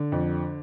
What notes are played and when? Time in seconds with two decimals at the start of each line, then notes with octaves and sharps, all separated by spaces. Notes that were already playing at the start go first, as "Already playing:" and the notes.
Already playing: D3
0.12 F2